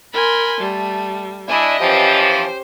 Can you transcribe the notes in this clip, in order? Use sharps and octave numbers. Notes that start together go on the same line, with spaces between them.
A#4 G#5 B5 C6
G3 A3
D4 E4 D#5 G#5
E3 F3 C#4 G4
C5